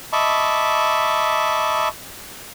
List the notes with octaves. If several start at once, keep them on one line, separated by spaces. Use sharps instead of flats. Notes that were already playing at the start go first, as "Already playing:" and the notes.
D#5 E5 A5 B5 C#6 D6